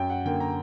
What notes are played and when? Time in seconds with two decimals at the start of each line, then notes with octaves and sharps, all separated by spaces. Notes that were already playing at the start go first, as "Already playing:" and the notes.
Already playing: F#2 G5
0.10 F#5
0.25 D3 A#3 G5
0.40 A#5